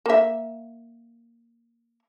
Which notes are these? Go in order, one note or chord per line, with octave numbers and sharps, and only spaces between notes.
A#3 E5